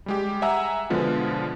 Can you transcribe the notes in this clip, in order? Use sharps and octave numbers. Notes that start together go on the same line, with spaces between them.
G3 G#3 G4
E5 F#5 G#5 A#5 E6
B2 D3 F3 G#3 B3